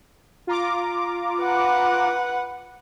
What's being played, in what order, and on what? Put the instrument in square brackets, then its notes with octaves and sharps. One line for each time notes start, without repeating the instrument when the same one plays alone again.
[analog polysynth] F4 A#5 D6
[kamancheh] B4 F#5